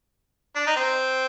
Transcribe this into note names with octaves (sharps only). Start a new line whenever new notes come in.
D4
D#4
C4